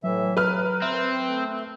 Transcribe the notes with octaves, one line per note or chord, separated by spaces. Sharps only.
A2 E3 F#3 E5
A#4 B4 F6
C4 E5
A3